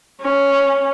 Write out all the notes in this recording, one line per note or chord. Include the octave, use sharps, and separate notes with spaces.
C#4